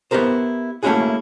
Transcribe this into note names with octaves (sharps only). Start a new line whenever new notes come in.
B3 E4 G4 A#4 C5
A3 A#3 C#4 E4 F#4 G#4